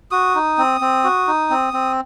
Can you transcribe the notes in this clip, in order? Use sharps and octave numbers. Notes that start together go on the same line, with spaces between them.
F#4 D#6
D#4
C4
C4
F#4
D#4
C4
C4